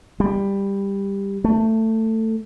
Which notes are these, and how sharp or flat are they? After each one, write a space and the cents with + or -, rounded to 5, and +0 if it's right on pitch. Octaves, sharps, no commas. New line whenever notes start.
G3 +10
A3 +15